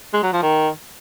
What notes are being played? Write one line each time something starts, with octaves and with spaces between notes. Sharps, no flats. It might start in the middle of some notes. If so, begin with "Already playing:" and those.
G#3
F#3
F3
D#3